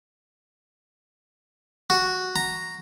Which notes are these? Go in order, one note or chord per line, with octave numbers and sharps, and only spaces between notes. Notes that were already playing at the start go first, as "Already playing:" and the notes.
F#4
A#5